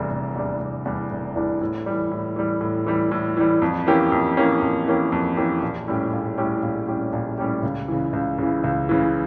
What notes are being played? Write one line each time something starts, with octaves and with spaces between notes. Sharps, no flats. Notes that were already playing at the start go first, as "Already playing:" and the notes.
Already playing: F1 E2 E3 G3 D4
F1
E2 E3 G3 D4
F1
E2 E3 G3 D4
F1
E2 E3 G3 D4
A2
E3 G3
A2
E3 G3
A2
E3 G3
A2
E3 G3
F2
E3 A#3 C#4 G4
F2
E3 A#3 C#4 G4
F2
E3 A#3 C#4 G4
F2
E3 A#3 C#4 G4
A#1
A2 G3 C#4 G4
A#1
A2 G3 C#4 G4
A#1
A2 G3 C#4 G4
A#1
A2 G3 C#4 G4
C#2
C#3 E3
C#2
C#3 E3
C#2
C#3 E3